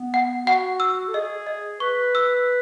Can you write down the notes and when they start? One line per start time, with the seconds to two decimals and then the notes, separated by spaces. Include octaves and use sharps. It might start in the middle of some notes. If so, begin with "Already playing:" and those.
Already playing: B3
0.14 F#5
0.47 F#4 F#5
0.80 E6
1.08 A4
1.14 G#4 D#5
1.47 D#5
1.80 B4 C#6
2.15 E6